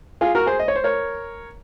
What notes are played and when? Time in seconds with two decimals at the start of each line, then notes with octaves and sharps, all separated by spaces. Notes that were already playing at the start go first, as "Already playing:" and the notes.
0.21 F4 G#4
0.35 F#4 A#4
0.47 G#4 C5
0.59 D#5
0.68 C#5
0.76 C5
0.84 A#4 C#5